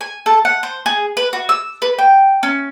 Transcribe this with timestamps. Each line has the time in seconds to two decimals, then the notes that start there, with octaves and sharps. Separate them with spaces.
0.01 G#5
0.26 A4
0.45 F#5
0.63 C5
0.86 G#4
1.17 B4
1.33 F#4
1.49 E6
1.82 B4
1.98 G5
2.43 C#4